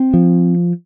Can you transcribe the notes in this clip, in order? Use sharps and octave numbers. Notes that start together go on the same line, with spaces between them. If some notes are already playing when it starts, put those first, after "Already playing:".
Already playing: C4
F3